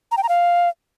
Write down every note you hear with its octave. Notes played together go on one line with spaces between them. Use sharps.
A#5
G5
A#5
F5